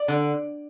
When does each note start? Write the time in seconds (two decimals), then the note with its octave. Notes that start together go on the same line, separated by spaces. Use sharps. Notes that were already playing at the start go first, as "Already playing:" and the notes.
Already playing: D5
0.08 D3